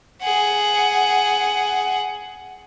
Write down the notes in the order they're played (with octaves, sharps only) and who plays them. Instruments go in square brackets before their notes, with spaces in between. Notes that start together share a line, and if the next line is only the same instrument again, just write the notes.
[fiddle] G#4 F#5